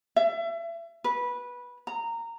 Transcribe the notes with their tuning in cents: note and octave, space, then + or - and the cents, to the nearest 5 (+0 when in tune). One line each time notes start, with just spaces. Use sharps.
E5 +35
B4 -15
A#5 -15